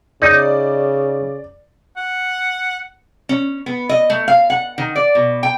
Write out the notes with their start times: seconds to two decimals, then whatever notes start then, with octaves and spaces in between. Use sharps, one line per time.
0.22 C#3 D#4 D5
1.97 F#5
3.29 C#4
3.66 B3
3.89 D#5
4.10 A3
4.28 F5
4.50 F#5
4.78 D#3
4.96 D5
5.15 B2
5.43 G5